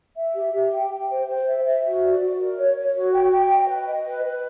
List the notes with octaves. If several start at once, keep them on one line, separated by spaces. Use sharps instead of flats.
E5
G4
G4
G5
G5
C5
C5
E5
E5
F#4
D5
F#4
A#4
C#5
C#5
F#4
G5
G5
D#5
B4
D#5
B4
B4